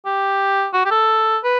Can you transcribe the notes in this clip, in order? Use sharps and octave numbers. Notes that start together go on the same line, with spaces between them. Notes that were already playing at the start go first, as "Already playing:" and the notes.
G4
F#4
G4
A4
B4